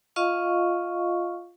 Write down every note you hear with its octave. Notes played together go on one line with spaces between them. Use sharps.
F4 D#5 F5 C#6